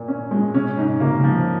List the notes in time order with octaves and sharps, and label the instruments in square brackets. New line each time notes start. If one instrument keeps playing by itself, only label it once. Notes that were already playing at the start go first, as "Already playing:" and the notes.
Already playing: [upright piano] A#2
C#4
G#3
[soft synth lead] C3 [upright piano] C#4
[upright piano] G#2
[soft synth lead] C#3 [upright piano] A#3
[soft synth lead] C3
C#3
[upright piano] F3